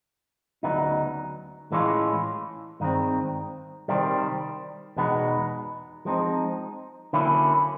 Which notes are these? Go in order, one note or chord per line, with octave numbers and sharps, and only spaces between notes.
D2 C#3 F#3 B3 D#4
A2 E3 G#3 C#4 F4
G2 D#3 G#3 C4
C2 C3 D#3 G3 C4
E2 B2 G#3 B3 D#4
F3 G#3 C4 D#4
D3 F#3 A#3 C#4 E4